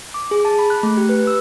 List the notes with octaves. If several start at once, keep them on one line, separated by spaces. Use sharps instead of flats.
D6
G#4
A5
B5
F#6
A3
G4
B4
E6